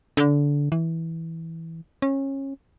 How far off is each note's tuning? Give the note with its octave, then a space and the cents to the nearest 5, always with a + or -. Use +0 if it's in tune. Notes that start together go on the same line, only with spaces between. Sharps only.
D3 -20
E3 -10
C#4 -25